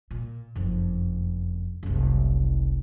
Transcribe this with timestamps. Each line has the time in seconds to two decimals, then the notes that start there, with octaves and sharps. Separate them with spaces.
0.11 A#2
0.55 F#1 F2
1.83 F#1 C2